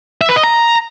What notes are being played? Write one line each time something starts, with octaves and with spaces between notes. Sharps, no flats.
E5
B4
D#5
A#5